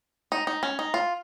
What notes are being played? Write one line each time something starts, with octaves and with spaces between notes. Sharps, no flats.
D#4
D#4
C#4
D#4
F4